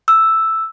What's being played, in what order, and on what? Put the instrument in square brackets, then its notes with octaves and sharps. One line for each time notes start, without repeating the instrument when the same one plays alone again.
[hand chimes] E6